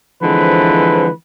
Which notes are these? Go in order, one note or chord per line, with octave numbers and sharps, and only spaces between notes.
D3 E3 F3 G#3 C4 B4